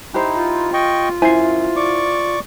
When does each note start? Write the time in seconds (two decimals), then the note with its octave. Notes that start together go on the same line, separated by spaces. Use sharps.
0.14 D#4 E4 G4 C5
0.36 F4
0.73 D#5 G5 C#6
1.22 F#2 E4 C5 E5 G#5 C7
1.76 D5 C#6 D6